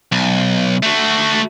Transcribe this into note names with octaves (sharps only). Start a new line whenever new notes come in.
B1
A3 F#4